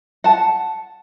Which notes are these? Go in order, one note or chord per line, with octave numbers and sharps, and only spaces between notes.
F#5 A5